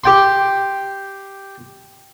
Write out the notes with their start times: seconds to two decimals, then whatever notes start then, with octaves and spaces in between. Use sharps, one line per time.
0.04 G4 G5 C6